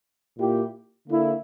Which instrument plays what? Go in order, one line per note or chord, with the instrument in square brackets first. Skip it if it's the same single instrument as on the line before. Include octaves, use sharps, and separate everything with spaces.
[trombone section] A#2 A#3 E4 G4
D3 A#3 E4